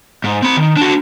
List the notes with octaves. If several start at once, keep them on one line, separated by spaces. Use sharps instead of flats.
G#2
C4 B5
D#3
D4 F#4